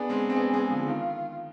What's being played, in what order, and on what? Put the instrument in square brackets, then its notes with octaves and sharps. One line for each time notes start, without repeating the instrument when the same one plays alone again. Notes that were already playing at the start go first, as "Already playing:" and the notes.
Already playing: [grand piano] B3 D4 [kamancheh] G#4
[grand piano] G#3 C4
C4
B3 D4
G#3 C4
D3 F3
[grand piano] D#3 [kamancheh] F4